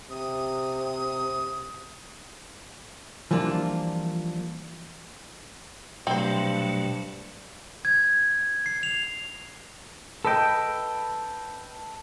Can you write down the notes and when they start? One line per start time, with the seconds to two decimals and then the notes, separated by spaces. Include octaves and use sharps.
0.10 C3 D#6
3.31 E3 F3 G3 A#3 D4 F4
6.07 G2 B2 F#3 A3 C4 C5
7.85 G#6
8.66 C7
8.83 F7
10.25 A4 B4 D#5 G5